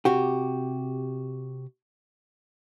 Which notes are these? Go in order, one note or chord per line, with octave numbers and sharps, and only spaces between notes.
C3 F#4 G4